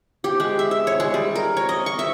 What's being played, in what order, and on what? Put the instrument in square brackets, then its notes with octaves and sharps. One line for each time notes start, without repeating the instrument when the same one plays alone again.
[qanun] G4
G#3
E5
E5
C#5
G#3
G3
A#4
C#5
D#5
C#6
E5